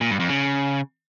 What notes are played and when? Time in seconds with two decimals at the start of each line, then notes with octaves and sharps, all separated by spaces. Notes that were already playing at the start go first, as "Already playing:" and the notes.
0.01 A#2
0.10 G2
0.20 F2
0.29 C#3